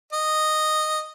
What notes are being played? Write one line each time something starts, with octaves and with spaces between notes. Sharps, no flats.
D#5